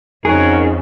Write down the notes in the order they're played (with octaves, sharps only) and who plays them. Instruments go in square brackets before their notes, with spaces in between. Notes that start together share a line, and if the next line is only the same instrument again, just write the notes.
[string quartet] F2 C#3 [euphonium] D#4 [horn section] F#4 A#4 C#5 [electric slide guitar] G#4